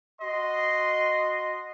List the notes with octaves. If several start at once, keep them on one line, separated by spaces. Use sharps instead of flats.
F#4 D#5 C6